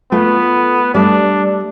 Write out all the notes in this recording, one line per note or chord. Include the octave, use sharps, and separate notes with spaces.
A3 B3 F4
G3 A3 D4 D5